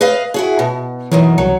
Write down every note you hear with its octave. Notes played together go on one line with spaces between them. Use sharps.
B4 D#5 F5
E4 F#4 G#4
B2
F#2 B2 D#3 E3
C2 F#3